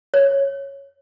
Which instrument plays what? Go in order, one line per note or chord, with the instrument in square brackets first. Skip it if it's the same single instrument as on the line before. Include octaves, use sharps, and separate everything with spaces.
[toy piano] C#5